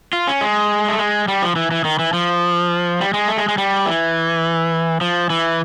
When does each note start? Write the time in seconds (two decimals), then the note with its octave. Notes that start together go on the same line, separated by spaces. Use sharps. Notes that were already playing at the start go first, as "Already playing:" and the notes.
0.13 F4
0.28 C#4
0.41 G#3
0.88 A3
0.99 G#3
1.28 G3
1.42 F3
1.56 E3
1.71 E3
1.85 D#3
1.99 E3
2.13 F3
3.00 G3
3.14 G#3
3.28 A3
3.38 G#3
3.48 G#3
3.58 G3
3.86 E3
5.01 F3
5.30 E3